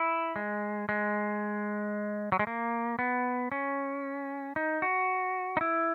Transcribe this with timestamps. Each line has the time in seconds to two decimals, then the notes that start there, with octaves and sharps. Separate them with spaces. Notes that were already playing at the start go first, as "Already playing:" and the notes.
Already playing: E4
0.36 G#3
0.89 G#3
2.32 F#3
2.39 G#3
2.47 A#3
2.99 B3
3.52 C#4
4.56 D#4
4.82 F#4
5.57 D#4
5.61 E4